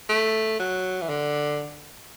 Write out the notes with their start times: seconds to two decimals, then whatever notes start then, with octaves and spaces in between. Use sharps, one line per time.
0.09 A3
0.60 F#3
1.01 E3
1.09 D3